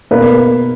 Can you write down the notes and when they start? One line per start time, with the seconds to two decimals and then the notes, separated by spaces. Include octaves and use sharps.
0.11 B2 A#3 D#4 B4
0.21 A#4